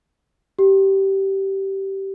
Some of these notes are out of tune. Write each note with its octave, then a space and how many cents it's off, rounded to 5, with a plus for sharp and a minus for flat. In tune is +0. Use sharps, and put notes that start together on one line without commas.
G4 -15